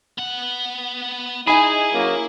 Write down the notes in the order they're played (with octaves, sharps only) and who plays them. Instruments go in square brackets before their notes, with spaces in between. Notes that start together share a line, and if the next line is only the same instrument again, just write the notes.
[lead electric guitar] B3 F#5
[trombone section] D#4 [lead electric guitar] E4 [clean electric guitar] G#4 [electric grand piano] G#5 B5
[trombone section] F#3 A#3 C#4